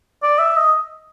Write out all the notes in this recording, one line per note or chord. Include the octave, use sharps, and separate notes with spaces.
D5
E5
D#5